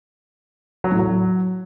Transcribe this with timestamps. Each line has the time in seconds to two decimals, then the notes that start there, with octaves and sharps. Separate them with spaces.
0.84 F#3
0.92 A2
0.99 F#3